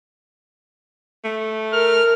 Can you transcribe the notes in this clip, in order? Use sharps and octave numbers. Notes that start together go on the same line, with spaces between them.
A3
A#4 F6